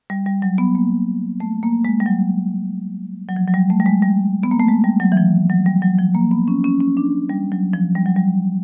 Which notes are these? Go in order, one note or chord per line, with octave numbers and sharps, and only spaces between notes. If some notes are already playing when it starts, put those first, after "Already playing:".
G3
G3
F#3
B3
A#3
A3
A#3
G#3
G3
F#3
F#3
F3
F#3
G3
A3
G3
G#3
G3
B3
A#3
A3
G#3
G3
F#3
E3
F3
F#3
G3
F#3
F3
A#3
B3
C#4
C#4
C#4
D4
G3
F#3
F3
G3
F#3
G3